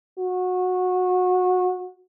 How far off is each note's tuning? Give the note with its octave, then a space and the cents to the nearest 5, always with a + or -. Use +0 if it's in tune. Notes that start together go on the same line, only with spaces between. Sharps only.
F#4 -20